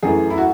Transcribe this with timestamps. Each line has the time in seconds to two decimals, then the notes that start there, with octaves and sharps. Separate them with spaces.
0.03 F#2 E3 A3 G#4
0.30 E4
0.38 F#4